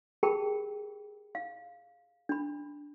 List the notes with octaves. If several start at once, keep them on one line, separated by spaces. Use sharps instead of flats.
G4 G#4 A#4 G5 A5 B5
F5
D4 B5